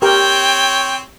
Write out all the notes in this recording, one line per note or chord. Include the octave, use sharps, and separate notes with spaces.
C4 G4 A#4 C#5 G5